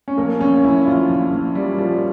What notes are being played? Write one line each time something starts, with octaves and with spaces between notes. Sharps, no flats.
C#4
A#1 A#3
A#1 C#4
A#1 E4
E4
A#1 F4
A#1
A#1
A#2 G3
A#2 F3